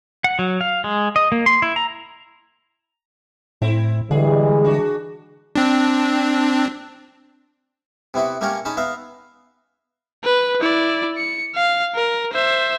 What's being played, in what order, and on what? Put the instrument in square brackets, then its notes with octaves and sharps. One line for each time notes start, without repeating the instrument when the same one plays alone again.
[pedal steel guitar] F#5
F#3
F5
G#3
D#5
A#3
C6
E4
A#5
[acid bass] A2 [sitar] C4 E4
[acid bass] D3 [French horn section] E3 G3 G#3 [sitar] G#4
[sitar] D4 F#4
[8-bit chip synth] C4 D4
[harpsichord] C3 B3 E4 F#4 B5
A3 A#3 C#4 G4 A#4 C#5
C#4 D#4 G#4 A5 B5
B3 E5 F5 A#5
[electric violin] B4
E4 D5
C#7
F5
A#4
C5 E5